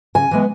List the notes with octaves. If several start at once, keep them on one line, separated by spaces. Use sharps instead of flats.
C#3 G#5
E3 G#3 B3